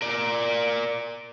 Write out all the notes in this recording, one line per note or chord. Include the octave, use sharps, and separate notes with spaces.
A#4 D5